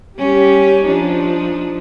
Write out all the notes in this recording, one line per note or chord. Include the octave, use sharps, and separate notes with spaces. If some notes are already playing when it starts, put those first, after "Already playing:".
G3 C#4 G4
F3 D4 D#4